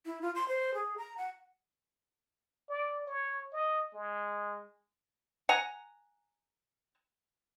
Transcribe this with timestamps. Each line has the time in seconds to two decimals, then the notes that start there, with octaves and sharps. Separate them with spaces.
0.06 E4
0.22 F4
0.35 C6
0.48 C5
0.74 G#4
0.98 A#5
1.18 F#5
2.69 D5
3.07 C#5
3.53 D#5
3.94 G#3
5.49 F#5 G#5 A#5